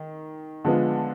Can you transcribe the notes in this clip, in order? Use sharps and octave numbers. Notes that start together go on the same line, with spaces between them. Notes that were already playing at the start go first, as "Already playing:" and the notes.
Already playing: D#3
D3 F3 G#3 B3 F4